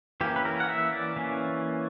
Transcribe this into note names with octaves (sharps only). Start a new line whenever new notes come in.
E3 A#3 C#4 G4
B4
A#4
F#5
E5
D5
E3 A#3 C#4